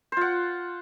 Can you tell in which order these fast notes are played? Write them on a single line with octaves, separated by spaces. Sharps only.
C5 F4 F#5